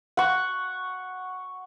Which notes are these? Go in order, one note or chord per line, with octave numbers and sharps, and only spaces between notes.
F#5 C#6